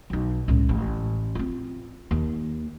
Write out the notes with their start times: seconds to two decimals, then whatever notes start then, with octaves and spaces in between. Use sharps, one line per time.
0.10 B1 D#4
0.48 C#2 A2
0.69 A1
1.35 C4 F4
2.11 D#2